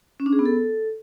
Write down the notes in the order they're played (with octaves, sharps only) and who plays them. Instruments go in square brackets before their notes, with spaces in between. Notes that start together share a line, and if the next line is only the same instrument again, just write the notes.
[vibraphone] C#4
D4
G#4
B3
A4